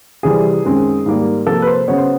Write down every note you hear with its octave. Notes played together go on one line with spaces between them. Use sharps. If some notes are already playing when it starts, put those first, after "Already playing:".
C3 E3 G3 C4 G#4
F#2 D#3 G#3 C4
G#2 D#3 G3 A#3
C3 F3 A#3 A4
B4
C5
C#3 F#3 B3 C#5
C5